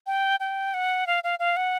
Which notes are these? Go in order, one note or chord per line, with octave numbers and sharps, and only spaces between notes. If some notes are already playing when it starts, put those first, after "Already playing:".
G5
G5
F#5
F5
F5
F5
F#5